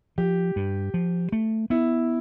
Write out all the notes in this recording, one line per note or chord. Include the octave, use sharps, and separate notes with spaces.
F3 G4
G2
F3
A3
B3 E4